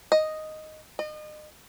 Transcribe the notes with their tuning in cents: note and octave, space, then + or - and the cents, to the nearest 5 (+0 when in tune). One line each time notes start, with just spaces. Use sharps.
D#5 +0
D#5 -35